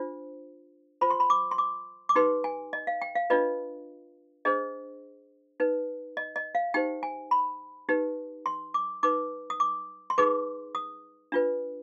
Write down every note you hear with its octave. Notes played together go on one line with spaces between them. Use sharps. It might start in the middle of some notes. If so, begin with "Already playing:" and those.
Already playing: D4 F4 C5
F4 C5 B5
C6
B5
D6
C6
D6
D6
D#4 G4 B4 C6
G#5
D#5
F5
G5
F5
D4 F4 B4 D#5
D4 G#4 C5 D#5
D#4 B4
D#5
D#5
F5
D#4 G4 C5 G5
G#5
B5
D#4 G4 B4
C6
D6
D#4 B4 D6
D#6
D6
C6
D#4 G#4 B4 D6
D#6
D4 F4 B4